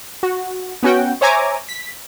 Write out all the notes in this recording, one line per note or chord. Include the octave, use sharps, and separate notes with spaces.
F#4
B3 C#4 F#4 G5
C5 C#5 E5 G#5 A#5 D6
B6